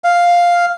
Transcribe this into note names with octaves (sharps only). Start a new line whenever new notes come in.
F5